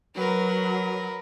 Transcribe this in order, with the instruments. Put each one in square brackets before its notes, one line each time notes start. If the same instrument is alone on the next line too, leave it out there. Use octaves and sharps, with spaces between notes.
[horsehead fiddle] F#3 [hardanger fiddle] A#4 B4